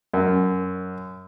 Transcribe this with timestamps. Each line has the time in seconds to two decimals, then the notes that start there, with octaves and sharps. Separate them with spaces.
0.14 F#2